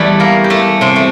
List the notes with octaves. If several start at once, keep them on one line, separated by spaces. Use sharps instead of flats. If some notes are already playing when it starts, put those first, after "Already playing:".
Already playing: E2 E3 G3 A3 A4
A#3 A#4
G4
A3 A4
C3 C4
A3